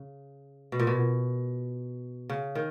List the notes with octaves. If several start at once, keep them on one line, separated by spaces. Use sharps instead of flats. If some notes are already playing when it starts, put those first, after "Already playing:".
Already playing: C#3
B2
A#2
B2
C#3
D#3